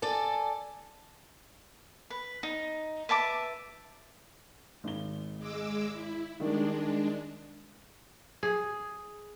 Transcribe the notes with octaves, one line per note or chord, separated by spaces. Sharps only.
A4 D5 G#5
B4
D#4
B4 E5 A5 D6
G#1 G7
G#3 D6 E6
E4
D#3 G3 G#3 D4
G#4